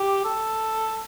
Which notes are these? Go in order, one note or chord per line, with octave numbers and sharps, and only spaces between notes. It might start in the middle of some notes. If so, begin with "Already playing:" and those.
Already playing: G4
A4